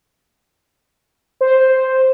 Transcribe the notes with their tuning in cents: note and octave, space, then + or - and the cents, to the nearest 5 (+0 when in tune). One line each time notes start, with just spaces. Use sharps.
C5 +0